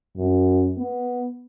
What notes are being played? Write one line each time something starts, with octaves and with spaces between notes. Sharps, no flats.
F#2
B3